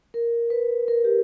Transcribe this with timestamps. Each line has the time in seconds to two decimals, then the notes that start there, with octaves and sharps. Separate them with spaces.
0.14 A#4
0.50 B4
0.88 A#4
1.04 G4